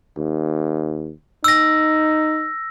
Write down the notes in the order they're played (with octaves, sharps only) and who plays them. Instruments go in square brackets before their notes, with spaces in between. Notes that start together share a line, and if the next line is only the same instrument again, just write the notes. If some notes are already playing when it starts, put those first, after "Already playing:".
[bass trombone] D#2
[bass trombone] D#4 [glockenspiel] E6 A#6